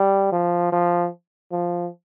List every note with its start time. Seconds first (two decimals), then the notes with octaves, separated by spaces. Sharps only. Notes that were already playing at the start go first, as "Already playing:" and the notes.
Already playing: G3
0.32 F3
0.72 F3
1.52 F3